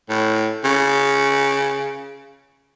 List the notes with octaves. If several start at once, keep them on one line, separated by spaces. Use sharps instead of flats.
A2
C#3